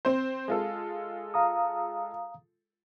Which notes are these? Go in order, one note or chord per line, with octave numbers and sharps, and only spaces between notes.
C4 C5
G#3 F4 A4
F5 A#5 D#6